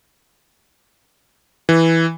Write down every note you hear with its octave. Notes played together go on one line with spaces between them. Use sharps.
E3